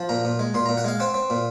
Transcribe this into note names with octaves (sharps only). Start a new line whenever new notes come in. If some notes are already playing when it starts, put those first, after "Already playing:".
Already playing: F3
A#2 A#5
A#2
G#3
A#2 C6
A#2 A#5
F#5
G#3 F5
C4 F#5
C4
A#2